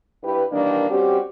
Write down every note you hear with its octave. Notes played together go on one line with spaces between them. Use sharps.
G2 E4 G4 B4
D#3 E3 G3 A#3 D4
G3 C4 C#4 F#4 G4